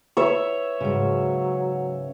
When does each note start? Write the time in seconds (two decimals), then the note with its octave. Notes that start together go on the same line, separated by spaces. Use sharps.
0.17 B4 C#5 E5
0.81 G#2 C#3 F#3